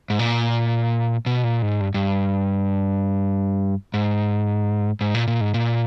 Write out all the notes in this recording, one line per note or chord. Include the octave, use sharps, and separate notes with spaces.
G#2
A#2
B2
A#2
G#2
G2
G2
G#2
G#2
A#2
A#2
G#2
A#2